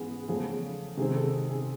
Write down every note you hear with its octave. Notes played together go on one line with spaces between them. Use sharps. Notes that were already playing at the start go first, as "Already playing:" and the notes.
Already playing: G#2 E3 B3 G#4
E2 C#3 F3 A3 G#4
C3 D#3 G#3 C4 G#4
A4
G#4